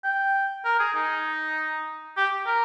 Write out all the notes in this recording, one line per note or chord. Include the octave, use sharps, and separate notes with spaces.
G5
A#4
G#4
D#4
G4
A#4